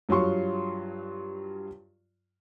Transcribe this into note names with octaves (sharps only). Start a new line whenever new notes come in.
G2 F#3 F4 C6 C#6